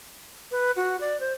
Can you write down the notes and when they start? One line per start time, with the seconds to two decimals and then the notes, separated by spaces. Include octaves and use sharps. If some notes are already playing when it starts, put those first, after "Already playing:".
0.51 B4
0.76 F#4
1.01 D5
1.20 C5